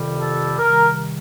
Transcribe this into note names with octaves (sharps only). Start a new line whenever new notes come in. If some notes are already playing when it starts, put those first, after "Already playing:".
Already playing: F2 C3 D#3 G3
A4
C3 D#3 G3 A#4